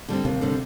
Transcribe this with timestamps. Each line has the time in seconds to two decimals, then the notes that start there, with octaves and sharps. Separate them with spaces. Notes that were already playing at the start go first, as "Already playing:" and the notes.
0.08 D3 G3 C4
0.25 D#2 C3
0.41 D3 G3 C4